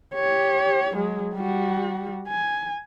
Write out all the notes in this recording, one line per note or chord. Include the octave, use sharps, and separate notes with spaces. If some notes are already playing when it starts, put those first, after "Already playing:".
G4 C#5
F#3 G#3
G3 F#4
G#5